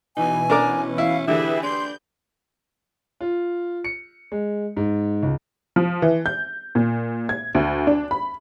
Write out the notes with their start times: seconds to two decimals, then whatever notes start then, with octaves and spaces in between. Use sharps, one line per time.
0.17 B2 E3 D#4 G#5
0.50 C#4 D4 A#4 D6
0.98 E4 F5
1.27 D3 E3 E4 G4 G#4 B4 E5
1.63 D4 C6 G6
3.21 F4
3.84 C#7
4.32 G#3
4.77 G#2
5.23 C#2
5.76 F3
6.02 E3
6.26 G6
6.75 A#2
7.29 G#6
7.55 D2
7.87 D4
8.11 B5